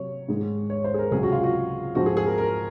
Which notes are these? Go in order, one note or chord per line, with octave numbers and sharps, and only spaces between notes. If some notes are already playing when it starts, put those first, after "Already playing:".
Already playing: C3 F#3 C#5
G#2 D#3 G#3
C#5
C5
G#4
A#4
C#2 C3 F#3 G#4
F#4
F4
F#4
G#2 F3 G#3 C4 F#4
G#4
G#4
A#4
A#4